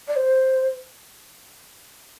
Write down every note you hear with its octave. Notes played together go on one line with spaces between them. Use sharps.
D5
C5